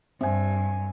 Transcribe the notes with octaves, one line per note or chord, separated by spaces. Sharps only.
G2 C4 E5 G#5